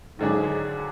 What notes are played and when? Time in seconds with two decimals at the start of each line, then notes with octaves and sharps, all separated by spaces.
0.19 D#2 G#2 D3 F#3 D4 G#4